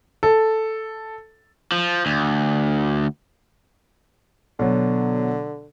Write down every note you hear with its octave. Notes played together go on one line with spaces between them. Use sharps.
A4
F3
D2
B2 D3 F#3